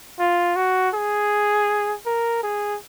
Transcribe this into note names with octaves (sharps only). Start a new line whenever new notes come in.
F4
F#4
G#4
A#4
G#4